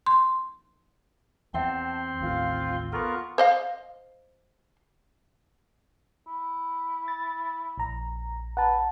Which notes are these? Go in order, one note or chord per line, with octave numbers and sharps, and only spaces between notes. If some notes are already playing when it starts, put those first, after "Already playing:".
C6
E2 C4 E5 F#5 G5 A5 C6
A1 D#2 F4 F5
B3 F4 A4 A#4 C6 C#6
C5 D#5 F5
E4
A6
A#1 A#5
B4 F#5 A5